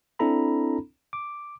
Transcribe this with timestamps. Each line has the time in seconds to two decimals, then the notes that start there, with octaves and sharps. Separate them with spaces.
0.19 C4 D4 E4 A4 A#5 B5
1.13 D6